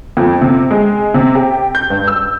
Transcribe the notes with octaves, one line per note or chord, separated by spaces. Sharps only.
F2
C3
G#3
C3
G4
G6
G2
E6